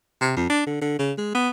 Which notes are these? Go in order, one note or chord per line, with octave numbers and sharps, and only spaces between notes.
C3
F2
D4
D3
D3
C#3
G#3
B3